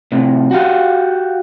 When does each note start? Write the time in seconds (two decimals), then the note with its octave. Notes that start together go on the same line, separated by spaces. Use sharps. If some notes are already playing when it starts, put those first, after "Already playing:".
0.12 A2 C3
0.51 F#4 G4 F5